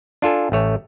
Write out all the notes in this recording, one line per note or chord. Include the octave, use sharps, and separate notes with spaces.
D4 F4 A4 G#5
A1 A3 C#5